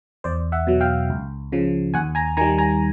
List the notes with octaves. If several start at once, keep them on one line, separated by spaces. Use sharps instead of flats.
E2 C5 D5
E5 F#5
B2 F#3
F5 G5
C#2
C#3 F3
D#2 F#5 G#5
G#5 A#5
D#3 G3 G#5 A#5
G#5 A#5